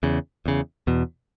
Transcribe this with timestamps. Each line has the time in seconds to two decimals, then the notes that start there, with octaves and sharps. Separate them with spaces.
0.03 E2 C#3
0.46 E2 C#3
0.87 E2 B2